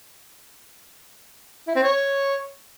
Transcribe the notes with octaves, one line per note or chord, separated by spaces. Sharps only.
E4
C4
C#5